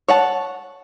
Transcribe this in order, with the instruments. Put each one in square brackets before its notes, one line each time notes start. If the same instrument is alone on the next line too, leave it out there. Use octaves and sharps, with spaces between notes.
[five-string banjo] C#5 F#5 A5